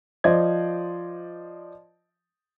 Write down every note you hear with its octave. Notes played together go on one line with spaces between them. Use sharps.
F3 C5 D5 D#5 G#6